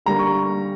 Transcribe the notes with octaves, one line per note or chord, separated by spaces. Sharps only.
D3 G3 A#3 A#5
C#6